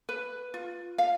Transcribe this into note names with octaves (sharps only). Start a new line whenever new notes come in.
B4
F4
F5